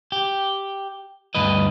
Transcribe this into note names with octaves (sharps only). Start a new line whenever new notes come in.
G4
D2 G2 B4 D#5